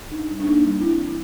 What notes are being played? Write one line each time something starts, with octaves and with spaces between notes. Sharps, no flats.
D4 D#4
G3
D4
A#3 D#4
G3
C4 E4
E3